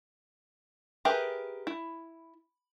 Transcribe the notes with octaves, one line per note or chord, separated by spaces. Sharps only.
G4 G#4 A#4 B4 E5
E4